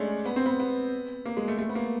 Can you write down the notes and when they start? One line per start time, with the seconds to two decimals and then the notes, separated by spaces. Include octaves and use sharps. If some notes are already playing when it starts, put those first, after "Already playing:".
Already playing: G#3 A3 C#4 D4
0.26 B3
0.36 C4
0.46 B3
0.60 B3
1.26 A#3
1.37 G#3
1.48 A3
1.58 A3
1.69 B3
1.75 A#3